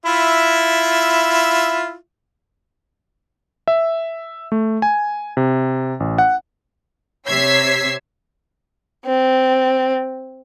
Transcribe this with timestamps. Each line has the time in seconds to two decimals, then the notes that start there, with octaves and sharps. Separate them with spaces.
0.06 E4 F4 E5
3.68 E5
4.52 A3
4.82 G#5
5.37 C3
6.00 A1
6.18 F#5
7.28 C3 C#5 E6 G#6 B6 C7
9.05 C4